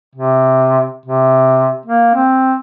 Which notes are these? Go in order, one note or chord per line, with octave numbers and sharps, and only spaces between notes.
C3
C3
A#3
C4